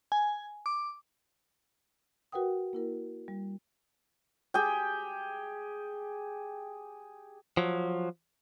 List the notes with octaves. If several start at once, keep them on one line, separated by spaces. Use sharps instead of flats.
G#5
D6
F#4 A#4 B4 F#5 G5 D#6
A#3 E4 A#4
G3
G4 G#4 G5
F3 F#3